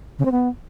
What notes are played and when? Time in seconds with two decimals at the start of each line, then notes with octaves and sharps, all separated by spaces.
0.19 C#3
0.25 C4
0.32 B3